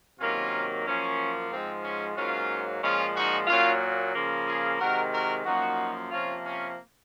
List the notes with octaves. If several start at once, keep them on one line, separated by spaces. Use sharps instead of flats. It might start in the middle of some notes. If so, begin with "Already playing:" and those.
C3 D#3 F#3 A#3 C#4 F4
F#2 F3 A#3 C#4
G#2 F3 G#3 C4
C#4
G#2 F#3 A#3 C#4 F4
A#2 F3 G#3 C#4 F4
D#4 F#4
A#2 F#3 A#3 C#4 F4
C#3 F3 A#3
F4 G#4
C3 D#3 G#3 F#4 A#4
F#4 A#4
F#2 F3 A#3 D#4 F#4
C3 F3 A#3 C#4 F4
C#4